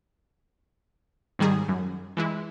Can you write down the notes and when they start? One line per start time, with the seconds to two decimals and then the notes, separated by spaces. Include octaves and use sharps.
1.39 G#2 D#3 G3 G#4
1.68 F#2
2.17 E3 G#3 E4